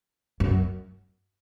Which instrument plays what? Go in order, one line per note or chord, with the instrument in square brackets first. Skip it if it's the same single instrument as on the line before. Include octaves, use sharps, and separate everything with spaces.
[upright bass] F#2